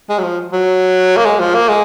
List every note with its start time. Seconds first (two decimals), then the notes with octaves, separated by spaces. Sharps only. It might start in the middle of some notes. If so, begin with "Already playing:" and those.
0.09 G#3
0.19 F#3
0.23 F3
0.53 F#3
1.17 A#3
1.25 G#3
1.40 F3
1.54 A#3
1.69 G#3